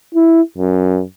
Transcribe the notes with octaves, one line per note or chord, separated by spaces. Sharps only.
E4
F#2